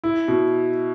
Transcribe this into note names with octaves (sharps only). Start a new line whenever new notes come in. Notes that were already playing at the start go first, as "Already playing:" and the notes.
E4
B2